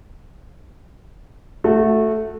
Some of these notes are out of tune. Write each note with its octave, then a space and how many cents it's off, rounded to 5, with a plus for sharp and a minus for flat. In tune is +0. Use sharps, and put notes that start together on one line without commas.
A3 +0 F#4 -20